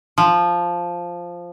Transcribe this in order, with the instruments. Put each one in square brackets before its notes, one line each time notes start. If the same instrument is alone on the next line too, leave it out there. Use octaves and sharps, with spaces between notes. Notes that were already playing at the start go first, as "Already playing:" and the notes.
[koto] F3